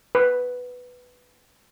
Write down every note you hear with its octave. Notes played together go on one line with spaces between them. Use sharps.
B4